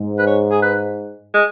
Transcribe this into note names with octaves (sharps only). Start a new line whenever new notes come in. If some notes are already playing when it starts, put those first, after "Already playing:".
Already playing: G#2
B4
C#5
G#4
B4
G#3